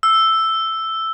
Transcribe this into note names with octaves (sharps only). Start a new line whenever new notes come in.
E6